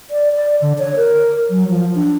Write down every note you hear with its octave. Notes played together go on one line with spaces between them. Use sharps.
D5
D5
D3
C#5
A#4
F#3
F3
D4